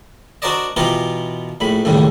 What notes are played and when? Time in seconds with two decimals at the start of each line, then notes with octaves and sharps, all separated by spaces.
0.42 D4 F#4 A#4 C5 D5 D#5
0.77 B2 E3 B3 F4 G4 A#4
1.60 A#1 A2 B5
1.85 A1 D#2 A2 C#3 G3